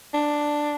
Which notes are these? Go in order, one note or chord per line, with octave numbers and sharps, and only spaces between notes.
D4